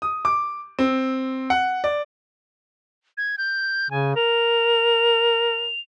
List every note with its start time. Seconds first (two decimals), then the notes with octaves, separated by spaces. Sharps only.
0.02 D#6
0.25 D6
0.79 C4
1.50 F#5
1.84 D5
3.18 G#6
3.38 G6
3.91 C#3 G#5
4.16 A#4 F7